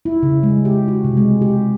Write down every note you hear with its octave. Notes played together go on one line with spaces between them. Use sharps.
E4
C#3
G#3
G4
F#4
C3
G#3
G4